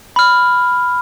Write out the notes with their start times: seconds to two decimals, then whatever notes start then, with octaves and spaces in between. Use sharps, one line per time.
0.16 B5 F6